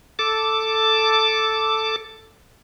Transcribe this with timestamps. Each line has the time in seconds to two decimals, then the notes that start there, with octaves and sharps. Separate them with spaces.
0.19 A4 A5 D6